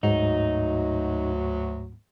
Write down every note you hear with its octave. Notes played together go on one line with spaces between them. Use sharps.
D2 G#2 F#3 D#4